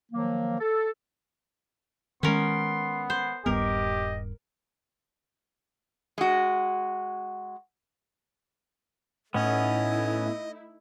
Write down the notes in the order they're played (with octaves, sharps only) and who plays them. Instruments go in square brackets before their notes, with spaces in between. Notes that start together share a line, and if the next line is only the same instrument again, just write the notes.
[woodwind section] D#3 F3 F#3 A#3
A4
[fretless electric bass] D#3 G#3 [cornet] B3 [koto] C#4 A#4 [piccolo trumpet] C6
[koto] C5
[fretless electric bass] D#1 G2 B3 [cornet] G4 [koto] A#4 [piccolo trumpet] D#5
[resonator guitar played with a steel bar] G#3 F#4
[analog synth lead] A2 [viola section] A3 D#4 E4 [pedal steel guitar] B3 C#4 [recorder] D#5